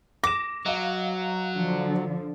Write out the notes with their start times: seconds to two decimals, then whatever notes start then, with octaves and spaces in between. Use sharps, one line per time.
0.24 D6 A#6 E7
0.66 F#3 D#5 F5
1.54 D3 F3